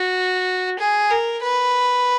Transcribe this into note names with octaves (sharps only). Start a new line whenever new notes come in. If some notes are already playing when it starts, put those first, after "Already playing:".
Already playing: F#4
G#4
A#4
B4